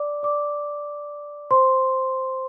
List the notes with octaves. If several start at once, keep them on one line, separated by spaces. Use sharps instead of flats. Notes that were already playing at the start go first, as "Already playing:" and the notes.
Already playing: D5 D6
D5 D6
C5 C6